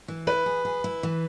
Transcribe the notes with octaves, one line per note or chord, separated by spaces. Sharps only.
E3
E4 B4
G#4
G#4
E4
E3